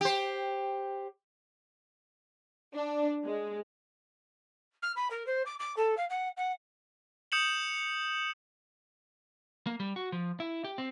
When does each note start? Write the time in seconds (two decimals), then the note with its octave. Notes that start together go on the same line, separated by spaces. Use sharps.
0.01 G4 C5
2.75 D4
3.25 G#3
4.82 F6
4.96 B5
5.10 A#4
5.26 C5
5.46 D6
5.59 D6
5.76 A4
5.97 F5
6.09 F#5
6.37 F#5
7.32 D#6 G6 C#7 E7 F#7
9.67 A#3
9.80 G3
9.96 F#4
10.12 F3
10.40 E4
10.64 G4
10.78 C4